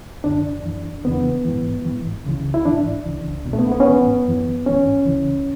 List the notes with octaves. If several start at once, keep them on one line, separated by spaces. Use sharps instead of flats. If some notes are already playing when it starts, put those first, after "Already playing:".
F#2 D3 D4
F#2 E3
E2 C#3 E3 B3
G#2 E3
G#2 E3
C#2 C#3 E3
E4
G#2 E3 D4
C#2 C#3 E3
C#2 B2
A3
B3
B3
C#4
G#2 E3 B3
F#2 E3
G#2 E3 C#4
C#2 C#3 E3